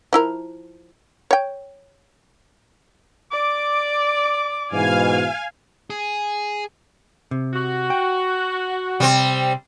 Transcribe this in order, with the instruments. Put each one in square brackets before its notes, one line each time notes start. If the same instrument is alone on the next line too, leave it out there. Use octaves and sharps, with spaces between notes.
[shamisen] F3 E4 A#4
C#5 G5
[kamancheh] D5 [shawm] D6
[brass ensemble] G#2 B2 E3 [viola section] F5 G#5
[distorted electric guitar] G#4
[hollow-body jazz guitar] C3
[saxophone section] F#4
[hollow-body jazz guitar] G5
[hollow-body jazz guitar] C3 [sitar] G3 C4